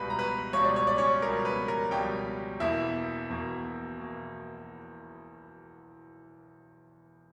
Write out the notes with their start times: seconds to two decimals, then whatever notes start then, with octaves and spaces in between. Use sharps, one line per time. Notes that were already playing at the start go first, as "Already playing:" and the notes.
Already playing: C#2 B2 G3 B4 B5
0.10 A#5
0.19 B4 B5
0.53 C#2 B2 G3 C#5
0.65 D5
0.76 C#5
0.87 D5
0.98 C#4 C#5
1.22 C#2 B2 G3 A#4
1.45 B4
1.68 A#4
1.91 C#2 B2 G3 G4 G5
2.60 E1 E2 B2 A#3 E4 E5
3.29 E1 E2 B2 A#3
4.01 B2 A#3